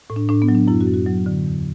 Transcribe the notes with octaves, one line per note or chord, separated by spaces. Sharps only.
A2
D4
A2 D4
B3
F#3
D4
F#2 E4
F#4
F#2
F#4
F#3
D3
E2